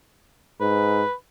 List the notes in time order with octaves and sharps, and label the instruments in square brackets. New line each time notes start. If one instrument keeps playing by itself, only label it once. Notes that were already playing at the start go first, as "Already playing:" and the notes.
[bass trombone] G#2 [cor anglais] B4